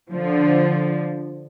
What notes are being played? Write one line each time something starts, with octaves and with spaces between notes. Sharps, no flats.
D3 F3